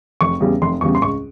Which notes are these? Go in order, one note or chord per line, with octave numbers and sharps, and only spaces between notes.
F1 C#6
E2 C#3 G3
F1 C6
E2 C#3 G3 C#6
C6
C#2 C#6